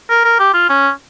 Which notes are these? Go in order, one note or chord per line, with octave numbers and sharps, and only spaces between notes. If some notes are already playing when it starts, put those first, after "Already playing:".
A#4
A#4
G4
F4
C#4